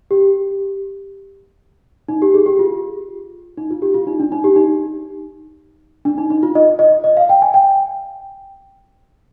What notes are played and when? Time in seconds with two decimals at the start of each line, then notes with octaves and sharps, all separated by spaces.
0.11 G4
2.09 D#4
2.22 G4
2.34 G#4
2.46 G4
2.59 F4
3.58 D#4
3.71 F4
3.82 G4
3.94 F4
4.07 D#4
4.20 D4
4.32 D#4
4.44 G4
4.56 D#4
6.05 D4
6.18 D#4
6.30 D#4
6.43 F4
6.55 D#5
6.79 D#5
7.04 D#5
7.17 F5
7.29 G5
7.42 G#5
7.54 G5